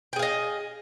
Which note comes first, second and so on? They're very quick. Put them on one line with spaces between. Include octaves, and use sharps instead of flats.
G5 G#4 F5 D#5